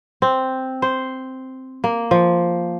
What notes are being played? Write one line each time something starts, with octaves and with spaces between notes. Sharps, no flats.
C4
C5
A#3
F3